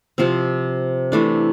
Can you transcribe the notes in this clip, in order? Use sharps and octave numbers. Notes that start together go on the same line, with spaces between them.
C3 F3 C4
C3 E3 A3 D4